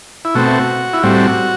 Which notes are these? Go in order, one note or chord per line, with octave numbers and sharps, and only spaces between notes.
E4
B2 A3 C4 F#4
E4
A2 G3 C4 F#4